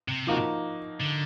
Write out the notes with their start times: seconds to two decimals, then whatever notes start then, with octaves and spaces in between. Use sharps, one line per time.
0.08 C3
0.27 F3 A#3 D#4 F#4
1.00 D3